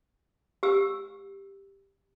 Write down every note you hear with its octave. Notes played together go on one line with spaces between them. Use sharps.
G4 E6